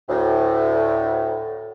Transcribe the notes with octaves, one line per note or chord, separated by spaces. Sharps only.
D2 A2